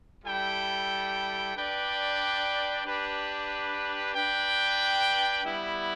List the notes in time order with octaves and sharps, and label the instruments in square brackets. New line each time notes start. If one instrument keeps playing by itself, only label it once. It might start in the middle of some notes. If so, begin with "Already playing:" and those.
[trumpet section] G3 E4 A4 G5
D4 B4 D5 G5
D4 G4 B4
D4 B4 G5
G3 B3 E4